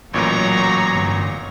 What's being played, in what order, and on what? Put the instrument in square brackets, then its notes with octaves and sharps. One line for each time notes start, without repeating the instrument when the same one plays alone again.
[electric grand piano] A1 A#2 [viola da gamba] F#3 [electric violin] C#5 A#5
[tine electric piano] G1